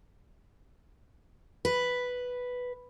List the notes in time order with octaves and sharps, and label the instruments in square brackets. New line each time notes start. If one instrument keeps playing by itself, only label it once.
[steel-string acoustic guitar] B4